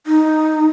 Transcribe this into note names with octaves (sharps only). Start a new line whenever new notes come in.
D#4